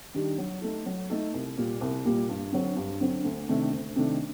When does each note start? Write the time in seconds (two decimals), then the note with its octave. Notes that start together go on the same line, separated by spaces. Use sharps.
0.14 D#3 G3 D4 G4
0.38 F#3
0.62 A3 D#4 A4
0.86 F#3
1.10 A3 D#4 A4
1.33 C2
1.57 A#2 G3 A#3
1.81 C2
2.05 A#2 G3 A#3
2.29 G2
2.52 D3 F#3 C4
2.76 G2
3.01 D3 F#3 C4
3.24 D2
3.49 C3 D#3 A3 D4
3.72 D2
3.96 C3 D#3 A3 D4